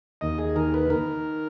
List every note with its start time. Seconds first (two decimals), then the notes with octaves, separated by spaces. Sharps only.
0.21 D#2 D#5
0.38 G#4
0.56 D#3 A#4
0.74 B4
0.90 D#3 A#4